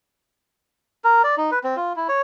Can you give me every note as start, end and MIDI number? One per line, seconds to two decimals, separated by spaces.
1.04 1.22 70
1.24 1.35 74
1.37 1.50 63
1.52 1.59 71
1.64 1.76 60
1.76 1.93 65
1.96 2.07 64
2.09 2.22 73